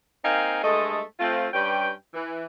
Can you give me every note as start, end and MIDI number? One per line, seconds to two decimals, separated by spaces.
0.24 0.60 58
0.24 0.60 60
0.24 0.60 63
0.24 0.60 77
0.24 0.60 79
0.24 0.60 80
0.63 1.00 43
0.63 1.00 56
0.63 1.00 57
0.63 1.00 69
0.63 1.00 75
1.19 1.47 57
1.19 1.47 60
1.19 1.47 65
1.53 1.91 43
1.53 1.91 55
1.53 1.91 61
1.53 1.91 71
1.53 1.91 79
2.14 2.44 52